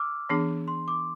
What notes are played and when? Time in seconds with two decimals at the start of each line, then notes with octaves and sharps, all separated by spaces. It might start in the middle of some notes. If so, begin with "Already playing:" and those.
Already playing: D6 E6 F6
0.29 E3 B3 D4 G#4
0.68 C6
0.88 D6